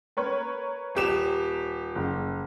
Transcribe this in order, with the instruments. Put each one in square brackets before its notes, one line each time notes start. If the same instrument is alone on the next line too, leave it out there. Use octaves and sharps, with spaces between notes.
[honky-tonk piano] A#4 B4 C#5
[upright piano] D#1 G4 E7
[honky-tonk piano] F#1